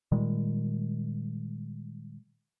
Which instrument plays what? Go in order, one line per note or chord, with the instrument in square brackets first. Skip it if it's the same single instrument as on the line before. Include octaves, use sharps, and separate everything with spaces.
[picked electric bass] A#2 D#3 G3 G#3